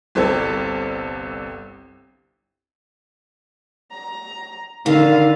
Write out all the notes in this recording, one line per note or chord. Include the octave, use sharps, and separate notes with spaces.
G1 C2 C4 A4 G#6
A#5
D3 D#3 F5